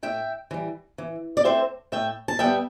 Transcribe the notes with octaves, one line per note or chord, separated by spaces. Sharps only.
A2 E5 G5
E3 G3
E3
D5
A3 C4 C5 E5
A2 E5 G5
A5
G3 B3 E5 G5